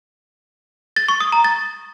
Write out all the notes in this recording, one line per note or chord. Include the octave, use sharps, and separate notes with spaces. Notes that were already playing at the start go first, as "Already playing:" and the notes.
A6
C#6
D#6
A#5
A6